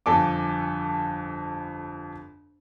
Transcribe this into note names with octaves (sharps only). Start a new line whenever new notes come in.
G1 F2 A4 G#5 D6